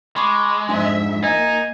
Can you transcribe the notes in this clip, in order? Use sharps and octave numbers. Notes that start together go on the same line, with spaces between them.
G#3 B5 C#6 D6
F2 G#2 D4 E5 G#5
A#3 D#4 D#5 G#5